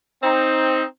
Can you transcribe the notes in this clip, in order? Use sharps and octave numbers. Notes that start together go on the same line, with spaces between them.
C4 D#4